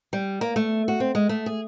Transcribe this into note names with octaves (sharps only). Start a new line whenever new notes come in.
G3
A#3
A3
F#4
C4
G#3
A3
G#4